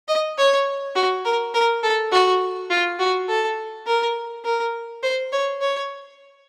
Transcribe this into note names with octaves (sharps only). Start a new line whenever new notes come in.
D#5
C#5
F#4
A#4
A#4
A4
F#4
F4
F#4
A4
A#4
A#4
C5
C#5
C#5